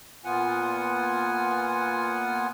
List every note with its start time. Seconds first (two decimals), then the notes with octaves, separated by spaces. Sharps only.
0.25 A#2 B3 F4 F#5 G#5